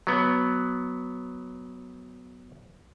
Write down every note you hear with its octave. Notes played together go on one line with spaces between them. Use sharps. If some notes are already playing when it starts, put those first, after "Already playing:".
F#3 B3